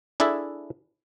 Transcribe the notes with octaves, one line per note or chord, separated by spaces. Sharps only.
D4 E4 G#4 A4 E5